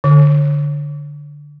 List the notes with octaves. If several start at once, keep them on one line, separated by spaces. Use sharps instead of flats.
D3